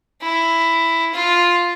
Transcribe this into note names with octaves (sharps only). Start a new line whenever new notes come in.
E4
F4